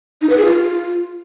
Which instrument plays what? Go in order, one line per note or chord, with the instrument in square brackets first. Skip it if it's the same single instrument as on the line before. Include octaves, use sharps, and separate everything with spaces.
[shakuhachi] D#4
B4
G#4
F4